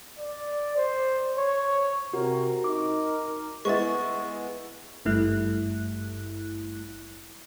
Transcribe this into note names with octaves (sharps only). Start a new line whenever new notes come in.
D5
C5
C#5
C3 F#4 A#4
D#4 D6
G#3 B3 E4 C#6 A6
G#1 G2 G3 A3 E4 F#6